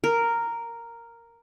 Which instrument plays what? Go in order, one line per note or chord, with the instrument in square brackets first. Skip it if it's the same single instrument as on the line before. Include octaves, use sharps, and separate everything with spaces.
[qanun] A#4